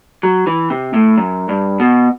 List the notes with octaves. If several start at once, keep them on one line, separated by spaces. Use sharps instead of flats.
F#3
E3
C3
A2
F#2
G2
B2